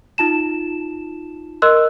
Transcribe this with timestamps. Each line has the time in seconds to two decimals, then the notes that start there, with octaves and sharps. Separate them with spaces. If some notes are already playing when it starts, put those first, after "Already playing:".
0.18 D#4 F4 A5 E7
1.62 A#4 D#5 C6 E6 F#6